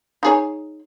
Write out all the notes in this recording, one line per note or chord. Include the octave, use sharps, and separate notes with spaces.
D#4 G#4 C#5